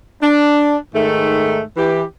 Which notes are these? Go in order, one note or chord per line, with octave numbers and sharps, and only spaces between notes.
D4
G#2 D#3 A3
E3 G4